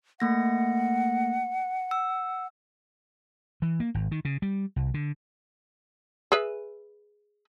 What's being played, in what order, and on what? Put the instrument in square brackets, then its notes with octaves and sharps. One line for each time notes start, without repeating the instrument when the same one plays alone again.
[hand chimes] A3 A#3 A#6 [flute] F#5
[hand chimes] E6
[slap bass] E3
A#3
G#1
D#3
C#3
G3
C2
D3
[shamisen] G#4 B4 E5